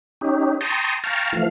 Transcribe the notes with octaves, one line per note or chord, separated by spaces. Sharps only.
C#4 D#4 G4
G5 A5 A#5 C6 C#6 D#6
F5 G5 A5 A#5 C#6
E3 F3 A3 F5